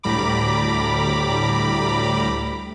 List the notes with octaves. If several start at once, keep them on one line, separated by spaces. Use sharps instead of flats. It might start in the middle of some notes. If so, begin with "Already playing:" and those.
D2 A2 G3 A#5 B5 D6